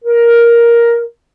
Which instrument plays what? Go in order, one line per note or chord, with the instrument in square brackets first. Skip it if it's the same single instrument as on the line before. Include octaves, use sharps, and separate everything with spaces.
[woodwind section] A#4